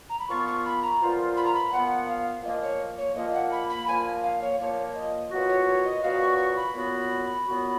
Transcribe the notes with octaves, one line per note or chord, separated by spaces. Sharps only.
A#5
B5
A#2 F3 B3 F4 C#6
C#6
B5
A#5
A#2 F3 B3 F4
B5
A#5
B5
A#2 F3 B3 F4 F#5
F5
A#2 F3 A#3 D#5
C#5
C#5
A#2 F3 A#3 D#5
F#5
B5
B5
A#2 F3 A#3 G#5
F5
C#5
A#2 F3 A#3 C#5
D#5
A#2 F#3 B3 F#4
C#5
C#5
D#5
A#2 F#3 B3 F#4 F5
C#6
C#6
B5
A#2 F#3 B3 F#4
A#2 F#3 B3 F#4